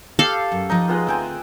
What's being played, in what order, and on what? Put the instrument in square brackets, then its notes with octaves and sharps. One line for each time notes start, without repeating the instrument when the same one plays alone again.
[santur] G4 [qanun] A4 F5
[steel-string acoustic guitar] F#2
[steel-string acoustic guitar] F3 B4 D#5 [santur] D#4
[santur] G#3 B3 F4
[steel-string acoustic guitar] D2 C4 G#4 [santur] E5 G5 G#5